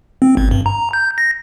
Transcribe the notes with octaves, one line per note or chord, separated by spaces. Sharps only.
C4
G#1
G2
A#5
G6
A#6